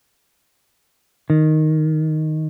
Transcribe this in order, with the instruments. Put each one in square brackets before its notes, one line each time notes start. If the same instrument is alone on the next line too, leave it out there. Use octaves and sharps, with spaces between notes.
[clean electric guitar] D#3